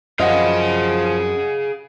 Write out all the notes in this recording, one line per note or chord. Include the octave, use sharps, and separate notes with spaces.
F#2 F3 G#4 D#5 F5 F#5